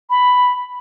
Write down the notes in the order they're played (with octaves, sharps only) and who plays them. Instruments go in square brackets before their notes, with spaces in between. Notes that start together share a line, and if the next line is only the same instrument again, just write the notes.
[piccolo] B5